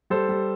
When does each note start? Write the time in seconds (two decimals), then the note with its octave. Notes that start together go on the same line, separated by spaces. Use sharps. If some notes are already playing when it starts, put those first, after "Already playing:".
0.10 G3 A4 C5
0.29 G3